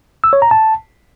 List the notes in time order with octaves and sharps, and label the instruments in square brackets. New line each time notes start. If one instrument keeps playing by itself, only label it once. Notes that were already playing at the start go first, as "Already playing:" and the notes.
[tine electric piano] E6
C#5
A#5
A5